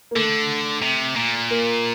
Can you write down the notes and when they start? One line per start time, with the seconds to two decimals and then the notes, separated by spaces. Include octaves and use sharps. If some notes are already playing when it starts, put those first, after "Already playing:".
0.11 A#3
0.15 D3 A3
0.82 C3
1.16 A#2
1.50 A#3